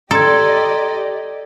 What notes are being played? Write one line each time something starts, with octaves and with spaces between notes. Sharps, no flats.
G4 A4 D5 D#5 A#5 C6 G#6